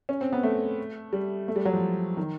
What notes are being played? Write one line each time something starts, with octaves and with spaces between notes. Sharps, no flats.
C#4
C4
B3
A3
G3
A3
G3
F#3
F3
D#3